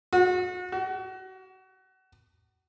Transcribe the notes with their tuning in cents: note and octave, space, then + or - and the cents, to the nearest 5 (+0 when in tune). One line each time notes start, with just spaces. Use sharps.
F#4 -30
F#4 +30